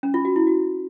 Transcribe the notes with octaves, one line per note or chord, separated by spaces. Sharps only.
C#4
F4
F#4
E4
F#4